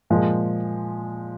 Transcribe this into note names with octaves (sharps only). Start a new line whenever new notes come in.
A#2 F3 G#3